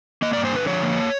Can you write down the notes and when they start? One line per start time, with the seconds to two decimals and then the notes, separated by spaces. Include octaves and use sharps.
0.22 A#3 D#5
0.33 G2 D5
0.45 C5
0.52 D3 B4
0.67 F3 C#5
0.83 A#3